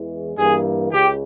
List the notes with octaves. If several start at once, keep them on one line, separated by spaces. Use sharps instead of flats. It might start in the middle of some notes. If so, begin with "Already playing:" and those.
Already playing: E2 E3 G#3
G2 E3 A#3 G#4
C#2 C#3 G4